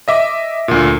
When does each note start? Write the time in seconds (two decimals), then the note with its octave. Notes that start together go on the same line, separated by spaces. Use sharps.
0.08 D#5 E5 D6
0.68 D2 A#2